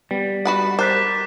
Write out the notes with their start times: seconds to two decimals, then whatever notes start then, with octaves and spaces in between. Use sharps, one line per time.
0.11 G3 B3
0.45 F#4 B4 F#5
0.79 A#4 C5 D6 F#6 A6 B6